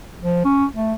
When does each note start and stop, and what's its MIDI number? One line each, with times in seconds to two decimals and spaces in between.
0.22 0.41 53
0.45 0.65 61
0.74 0.94 57